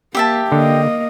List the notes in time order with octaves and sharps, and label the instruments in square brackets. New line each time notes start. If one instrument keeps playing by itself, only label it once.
[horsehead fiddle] A#3 [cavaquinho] G4 E5 A5
[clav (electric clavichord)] D3 [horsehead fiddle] A#3 D#5